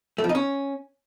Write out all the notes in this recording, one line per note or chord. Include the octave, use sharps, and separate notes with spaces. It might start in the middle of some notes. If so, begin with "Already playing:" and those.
A3
F3
D#4
C#4